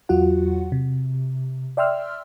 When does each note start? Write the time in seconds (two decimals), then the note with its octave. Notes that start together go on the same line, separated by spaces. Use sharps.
0.09 E2 F#3 F4 F#4 F#5
0.72 C3
1.77 D5 E5 G5 C6 E6 F6